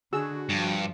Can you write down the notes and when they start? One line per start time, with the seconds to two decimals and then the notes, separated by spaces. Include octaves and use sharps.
0.13 D3 F#4 G#4 E6
0.49 G2 F3